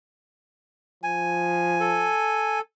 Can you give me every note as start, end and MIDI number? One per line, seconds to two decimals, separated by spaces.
1.03 2.12 53
1.03 2.59 80
1.80 2.61 69